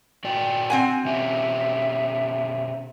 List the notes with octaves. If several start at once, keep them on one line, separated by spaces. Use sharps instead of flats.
A#2 F#4 D5 G5
C4 F#5 G#5
B2 C#4 G4 E5